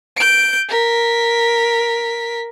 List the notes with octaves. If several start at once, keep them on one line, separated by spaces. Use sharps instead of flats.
G6 D7
A#4 B6